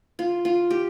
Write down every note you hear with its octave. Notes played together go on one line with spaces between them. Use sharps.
F4
F4
G4